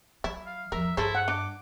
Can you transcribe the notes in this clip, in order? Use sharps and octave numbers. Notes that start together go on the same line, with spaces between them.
F#3 E4
F5
E2 F3 A#4 E5
G2 E4 G#4 A4 C5
F#5
D4 D6